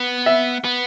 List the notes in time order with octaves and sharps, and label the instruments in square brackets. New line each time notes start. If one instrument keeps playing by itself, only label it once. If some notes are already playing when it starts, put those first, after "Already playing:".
Already playing: [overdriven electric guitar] B3
[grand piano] E5
[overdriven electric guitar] B3